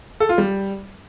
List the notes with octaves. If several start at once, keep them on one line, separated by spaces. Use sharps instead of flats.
A4
F4
G3